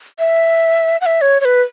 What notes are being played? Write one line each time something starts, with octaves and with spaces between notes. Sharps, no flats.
E5
F#5
E5
C#5
C#5
B4